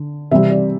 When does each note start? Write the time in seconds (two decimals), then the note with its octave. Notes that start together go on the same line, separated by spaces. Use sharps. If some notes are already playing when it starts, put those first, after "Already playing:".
Already playing: D3
0.31 C3 E3 G3 C4 E5
0.51 D5